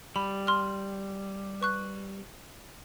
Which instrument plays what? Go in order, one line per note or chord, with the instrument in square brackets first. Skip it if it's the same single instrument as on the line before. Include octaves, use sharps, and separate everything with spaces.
[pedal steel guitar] G3 [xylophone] B5
[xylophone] C6 F6
B4 C#6 F#6